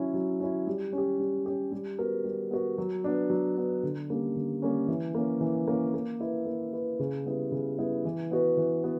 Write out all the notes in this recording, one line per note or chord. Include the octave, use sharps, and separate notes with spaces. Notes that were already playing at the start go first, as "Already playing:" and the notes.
Already playing: F#3 C#4 E4
F#3
C#4 E4
G3
C#4
G4
G3
C#4 G4
G3
B3 F#4 A#4
G3
B3 F#4 A#4
F#3
B3 D4
F#3
B3 D4
D3
G3 A#3 C#4
D3
G3 A#3 C#4
E3
A#3 C#4
E3
A#3 C#4
A#3
E4 B4
A#3
E4 B4
C#3
G3 B3 E4
C#3
G3 B3 E4
E3
B3 F#4 B4
E3
B3 F#4 B4